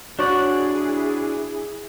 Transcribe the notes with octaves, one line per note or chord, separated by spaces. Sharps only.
D4 E4 F#4 G#4 C#5 D5 F#5 C#6